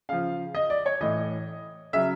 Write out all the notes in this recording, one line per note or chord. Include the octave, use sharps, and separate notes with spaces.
C#3 F3 F5
D#5
D5
C#5
A2 E3 D#5
C#3 F#3 E5